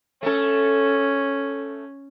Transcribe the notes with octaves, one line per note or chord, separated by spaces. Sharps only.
A3 C#4 A4